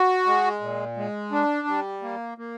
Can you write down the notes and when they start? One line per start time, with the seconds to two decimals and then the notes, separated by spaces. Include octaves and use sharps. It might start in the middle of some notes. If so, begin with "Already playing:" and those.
Already playing: F#4
0.26 G#3
0.61 A#2
0.97 G#3
1.32 D4
1.67 G3
2.02 A#3
2.38 A#3